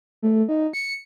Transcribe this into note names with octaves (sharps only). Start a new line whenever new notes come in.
A3
D#4
C#7